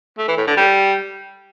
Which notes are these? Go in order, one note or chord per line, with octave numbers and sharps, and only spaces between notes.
A3
E3
A2
D3
G3